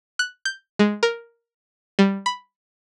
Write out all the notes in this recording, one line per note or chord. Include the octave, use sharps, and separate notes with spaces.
F#6
G6
G#3
A#4
G3
B5